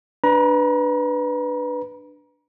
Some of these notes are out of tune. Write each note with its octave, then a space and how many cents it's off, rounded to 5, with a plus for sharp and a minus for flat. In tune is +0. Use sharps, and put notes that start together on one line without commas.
D4 +5 B4 +0 A#5 +35